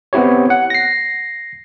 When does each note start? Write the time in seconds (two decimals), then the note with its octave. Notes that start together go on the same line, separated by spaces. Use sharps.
0.13 B3 C4 E4 G4 C#5
0.50 F#5
0.70 A#6 C7